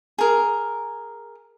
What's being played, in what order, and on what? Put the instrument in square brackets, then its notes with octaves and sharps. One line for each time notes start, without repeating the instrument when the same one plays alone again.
[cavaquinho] G#4 A#4